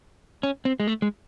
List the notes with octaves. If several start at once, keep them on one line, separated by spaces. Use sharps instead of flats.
C#4
C4
G#3
A3
G#3